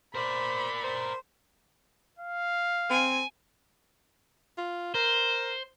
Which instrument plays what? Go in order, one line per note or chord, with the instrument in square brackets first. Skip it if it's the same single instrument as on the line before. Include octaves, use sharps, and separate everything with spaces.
[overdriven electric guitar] A#4 D5 [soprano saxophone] C5 [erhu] B5
[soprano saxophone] C5
[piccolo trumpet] F5
[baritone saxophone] C4 [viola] G#5
[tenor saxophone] F4
[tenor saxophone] A#4 [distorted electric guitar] C5